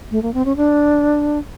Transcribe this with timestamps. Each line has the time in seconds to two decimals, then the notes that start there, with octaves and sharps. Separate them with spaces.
0.11 A3
0.23 A#3
0.34 C4
0.45 C#4
0.57 D4